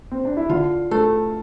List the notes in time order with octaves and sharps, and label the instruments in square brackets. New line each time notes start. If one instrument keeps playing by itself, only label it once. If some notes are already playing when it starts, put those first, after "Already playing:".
[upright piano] C4
D4
E4
[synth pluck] D3 [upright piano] F4
[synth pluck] A3 [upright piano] A4